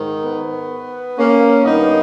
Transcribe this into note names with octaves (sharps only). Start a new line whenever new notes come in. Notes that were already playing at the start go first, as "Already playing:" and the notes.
Already playing: G#2 D#3
B3
A#3 C#4
G2 D#3 B3 D#4